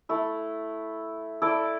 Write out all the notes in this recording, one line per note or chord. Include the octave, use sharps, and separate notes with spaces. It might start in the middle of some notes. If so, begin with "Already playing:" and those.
A3 E4 A4
E4 A4 D5